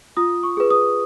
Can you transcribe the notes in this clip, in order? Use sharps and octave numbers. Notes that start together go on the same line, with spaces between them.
F4 D#6
C#6
G#4 B4
D#6